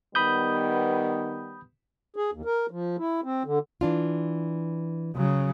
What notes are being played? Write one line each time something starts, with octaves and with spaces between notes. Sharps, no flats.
D#3 G3 B3 B5 D#6 G6
G#4
D#2
A#4
F3
E4
C4
D3
E3 D4 F4
C#3 F#3